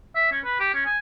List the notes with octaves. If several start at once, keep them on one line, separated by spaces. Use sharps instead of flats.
E5
C#4
B4
G4
C#4
G#5